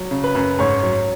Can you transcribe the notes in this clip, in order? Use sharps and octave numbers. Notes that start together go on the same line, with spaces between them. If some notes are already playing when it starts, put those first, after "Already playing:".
Already playing: F#3
C#3
B4
F#2
G#2 C#5
F#3